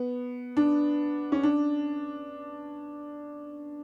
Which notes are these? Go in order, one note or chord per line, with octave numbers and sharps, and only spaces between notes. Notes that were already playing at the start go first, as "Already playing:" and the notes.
Already playing: B3
D4
C#4
D4